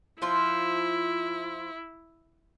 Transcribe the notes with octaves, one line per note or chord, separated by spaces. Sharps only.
F3 E4 F4